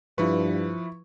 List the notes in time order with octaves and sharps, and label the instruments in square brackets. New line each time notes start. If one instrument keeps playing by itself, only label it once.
[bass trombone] G2 [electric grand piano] F3 B4 [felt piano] E4 C#6